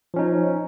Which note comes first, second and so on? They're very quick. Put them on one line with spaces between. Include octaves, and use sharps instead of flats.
F3 C#4 D#4